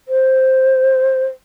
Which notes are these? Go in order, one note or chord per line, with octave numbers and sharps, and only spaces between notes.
C5